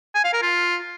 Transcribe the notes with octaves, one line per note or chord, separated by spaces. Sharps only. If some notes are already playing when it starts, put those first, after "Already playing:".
G#5
F5
A#4
F4